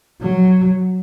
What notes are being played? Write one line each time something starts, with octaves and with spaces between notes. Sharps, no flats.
F#3